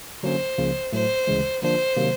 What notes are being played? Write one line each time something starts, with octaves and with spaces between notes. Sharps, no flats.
D3 F#3 A#3 C#4 C5
C#2 C#3 F3 A#3
A2 F#3 A3 C5
D2 C#3 E3 G#3
D3 F3 A#3 D4 F4 C5
C3 D#3 F#3 A#3